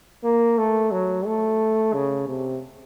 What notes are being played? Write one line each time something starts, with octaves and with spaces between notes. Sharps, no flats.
A#3
A3
F#3
A3
C#3
C3